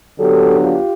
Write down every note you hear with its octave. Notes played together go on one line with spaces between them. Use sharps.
D3 F#3 B3 D4 G4 A4
F4 G4